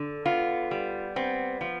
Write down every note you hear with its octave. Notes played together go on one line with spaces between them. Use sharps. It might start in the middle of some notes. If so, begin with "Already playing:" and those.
Already playing: D3
B3 F4
G3
B3 C4
F3